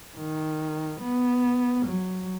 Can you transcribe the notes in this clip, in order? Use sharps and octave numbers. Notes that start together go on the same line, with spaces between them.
D#3
B3
F#3